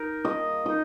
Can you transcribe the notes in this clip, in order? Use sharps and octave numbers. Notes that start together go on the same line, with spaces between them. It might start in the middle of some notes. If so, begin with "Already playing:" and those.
Already playing: D#4 A#4
A#3 D#5
D#4 D#5